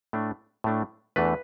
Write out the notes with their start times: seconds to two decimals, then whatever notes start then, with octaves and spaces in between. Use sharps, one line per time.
0.13 A2 A3 D4
0.64 A2 A3 D4
1.16 E2 E3 A3 D4 B4